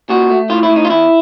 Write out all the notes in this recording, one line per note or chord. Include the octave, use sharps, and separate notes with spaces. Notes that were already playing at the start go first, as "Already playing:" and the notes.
A#2 F#4
A3
A2 F4
E4
A2
D#4
F4
E2 E4